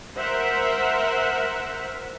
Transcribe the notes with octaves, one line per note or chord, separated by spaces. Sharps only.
A#4 C5 E5 F#5